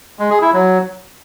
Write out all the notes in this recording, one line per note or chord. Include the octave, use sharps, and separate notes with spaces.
G#3
G#4
E4
F#3